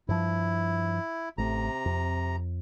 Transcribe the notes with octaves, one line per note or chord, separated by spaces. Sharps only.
G2 F3 E4
A1 C3 A3 A#5
F2